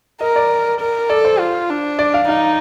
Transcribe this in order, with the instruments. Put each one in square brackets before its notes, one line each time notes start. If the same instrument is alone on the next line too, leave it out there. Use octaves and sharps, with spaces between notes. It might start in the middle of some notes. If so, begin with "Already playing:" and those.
[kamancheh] A#4 [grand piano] D#5
[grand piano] D5
[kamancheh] A#4
[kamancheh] A4 [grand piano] D5
[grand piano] C5
[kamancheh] F4
D4
[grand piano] D5
F5
[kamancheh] D#4 [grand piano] F5